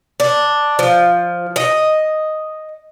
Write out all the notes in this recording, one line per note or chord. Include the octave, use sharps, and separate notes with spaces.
D4
F3
D#5